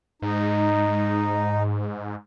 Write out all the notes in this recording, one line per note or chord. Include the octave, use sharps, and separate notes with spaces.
G#2 D#4